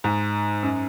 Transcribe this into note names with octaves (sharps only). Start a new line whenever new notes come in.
G#2
F#2